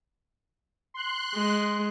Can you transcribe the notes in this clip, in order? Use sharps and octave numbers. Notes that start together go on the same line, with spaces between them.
C6 F#6
G#3